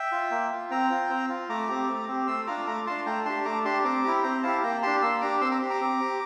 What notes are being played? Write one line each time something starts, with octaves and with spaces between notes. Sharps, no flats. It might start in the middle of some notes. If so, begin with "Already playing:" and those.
Already playing: E5 G5
F4
A#3
F4
C4 G5 A#5
F4
C4
F4
A3 A#5 D6
C4 G4
A3
C4 G4
A3 C6 E6
D4 F4 A#5 D6
A3 A#5 D6
D4 F4 A5 C6
A3 G5 A#5
D4 G4 A5 C6
A3 A#5 D6
D4 G4 A5 C6
C4 A#5 D6
E4 G4
C4 G5 A#5
E4 G4 F5 A5
A#3 G5 A#5
D4 G4 A5 C6
A#3 C6 E6
D4 G4 A#5 D6
C4 C6 E6
A#5 D6
G4
A#5 D6
C4
G4